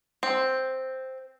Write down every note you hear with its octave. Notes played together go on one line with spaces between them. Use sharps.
C4